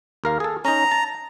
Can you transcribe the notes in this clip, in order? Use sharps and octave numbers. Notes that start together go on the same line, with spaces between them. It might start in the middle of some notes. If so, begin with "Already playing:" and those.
D#2 A#4 F5
G#4 A4
C#4 D#4 A#5
A5